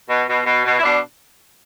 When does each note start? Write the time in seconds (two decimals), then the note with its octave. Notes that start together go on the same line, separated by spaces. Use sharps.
0.09 B2
0.27 B2
0.46 B2
0.64 B2
0.79 E4
0.83 B2 D4